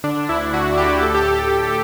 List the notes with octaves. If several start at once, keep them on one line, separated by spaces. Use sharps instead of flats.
D3 D4
D2 E4
D3 F#4
D2 G4
A2 A4
G4